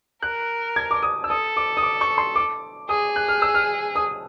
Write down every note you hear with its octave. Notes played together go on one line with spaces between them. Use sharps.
A#4 F#6
G#6
D6
D#6
E6
A4 D#6
D6
D#6
D6
C#6
C6
D6
G#4 D#6
F#6
F6
E6
F6
D#6